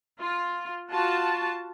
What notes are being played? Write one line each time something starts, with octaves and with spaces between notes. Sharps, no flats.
F4
F4 F#4 A5